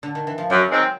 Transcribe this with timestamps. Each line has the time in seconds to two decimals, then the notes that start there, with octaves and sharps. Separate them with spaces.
0.03 D3
0.15 D#3
0.27 E3
0.38 F3
0.50 F#2 F#3
0.71 D#3 G#3 C4